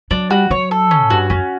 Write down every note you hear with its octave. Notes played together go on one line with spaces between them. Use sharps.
F#3 D4
G3 F#4
F#3 C#5
A4
C#4
A2
G2 F#4
F#2 C#4